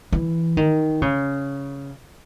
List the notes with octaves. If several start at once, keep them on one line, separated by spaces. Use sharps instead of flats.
E3
D#3
C#3